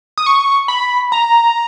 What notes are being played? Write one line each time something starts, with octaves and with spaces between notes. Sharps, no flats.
D#6
C#6
B5
A#5